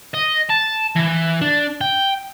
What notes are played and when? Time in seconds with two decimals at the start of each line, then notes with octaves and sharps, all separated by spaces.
0.14 D#5
0.50 A5
0.96 E3
1.41 D4
1.81 G5